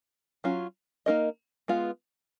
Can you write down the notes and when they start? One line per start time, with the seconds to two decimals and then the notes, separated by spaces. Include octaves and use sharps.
0.44 F#3 C#4 F4
1.06 A#3 D#4 A#4 D#5
1.68 G#3 B3 F4